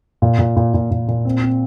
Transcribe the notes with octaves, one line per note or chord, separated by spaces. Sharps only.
A#2
A#2
A#2
A#2
A#2
A#2
C4
C4